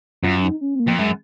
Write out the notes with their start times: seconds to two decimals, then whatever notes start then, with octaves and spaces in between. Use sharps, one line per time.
0.23 F#2 F4
0.43 D#4
0.61 C#4
0.75 C4
0.80 A#3
0.87 F2
0.98 F#2 G#3